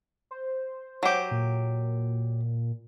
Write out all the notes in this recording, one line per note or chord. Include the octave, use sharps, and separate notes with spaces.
C5
F#3 G4
A#2